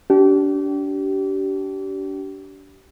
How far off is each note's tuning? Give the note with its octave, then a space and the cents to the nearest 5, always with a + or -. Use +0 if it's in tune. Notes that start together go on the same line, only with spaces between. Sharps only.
D4 -30 G4 -35